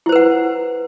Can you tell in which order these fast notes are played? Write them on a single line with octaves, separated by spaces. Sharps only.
E4 C5 B4 F#5